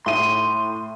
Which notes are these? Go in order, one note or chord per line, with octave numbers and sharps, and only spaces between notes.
A2 C6 D#7